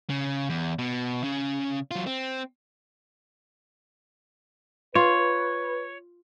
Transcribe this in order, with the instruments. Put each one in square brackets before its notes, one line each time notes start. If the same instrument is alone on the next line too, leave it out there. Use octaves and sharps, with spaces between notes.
[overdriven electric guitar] C#3
E2
B2
C#3
F#3 F4
C4
[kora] F4 [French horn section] B4 [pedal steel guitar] C#5